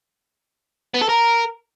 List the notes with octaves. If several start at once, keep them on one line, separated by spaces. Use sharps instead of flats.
B3
A4
A#4